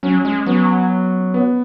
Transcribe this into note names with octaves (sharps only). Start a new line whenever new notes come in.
F#3 C#4
G#3
F#3 B3
B3